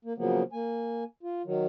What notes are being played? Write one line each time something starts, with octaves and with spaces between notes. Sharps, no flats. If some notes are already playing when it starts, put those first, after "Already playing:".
A#3
C#3 F3 F#3 A#3 B3
A#3 G#5
F4
D#3 F#3